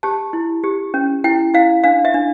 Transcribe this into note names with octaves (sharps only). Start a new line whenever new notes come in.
G4 A5
E4
G4
C#4
E4 G5
E4 F5
D4 F5
E5
D4